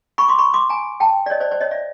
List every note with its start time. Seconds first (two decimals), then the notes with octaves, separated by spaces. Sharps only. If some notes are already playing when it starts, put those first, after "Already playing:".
0.18 B5 C#6
0.28 C6 D6
0.38 B5 C#6
0.54 C6 D6
0.69 G#5 A#5
1.00 G5 A5
1.26 D5
1.30 C#5 D#5
1.40 C5 D5
1.51 C5 D5
1.61 C#5 D#5
1.71 D5 E5